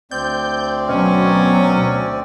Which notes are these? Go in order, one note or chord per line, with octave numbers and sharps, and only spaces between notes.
D2 C4 D5 G6
B2 F#3 C#4